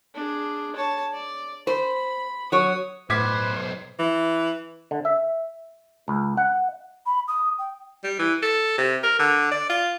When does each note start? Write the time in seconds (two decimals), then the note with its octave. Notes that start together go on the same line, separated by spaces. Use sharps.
0.14 D4 G#4
0.76 C#5 A5
1.13 D5
1.67 C5 B5
2.52 F#3 C#5 D#6
3.10 B1 A2 B4 C5 D6 G#6 B6
3.99 E3
4.91 D3
5.05 E5
6.08 C#2
6.37 F#5
7.06 B5
7.28 D#6
7.59 G5
8.04 G3
8.19 E3
8.43 A4
8.78 C3
9.03 A#4
9.19 D3
9.52 D5
9.70 F4